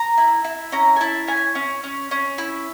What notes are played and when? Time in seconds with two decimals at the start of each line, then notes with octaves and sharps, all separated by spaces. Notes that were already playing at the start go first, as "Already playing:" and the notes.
Already playing: A#5
0.18 E4
0.45 E4
0.72 C#4 A#5
0.96 G#5
1.00 E4 A5
1.28 C#4 G#5
1.55 C#4
1.84 C#4
2.11 C#4
2.38 E4